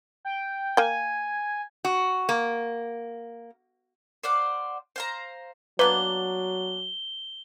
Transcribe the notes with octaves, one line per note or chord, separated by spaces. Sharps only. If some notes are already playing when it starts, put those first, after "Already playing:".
G5
A#3 G5 G#5
F#4
A#3
C5 D5 F5 F#5
C5 F5 A#5
F#3 A#3 B3 D4 B4 G7